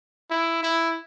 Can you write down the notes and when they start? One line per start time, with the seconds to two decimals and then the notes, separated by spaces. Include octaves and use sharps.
0.31 E4
0.63 E4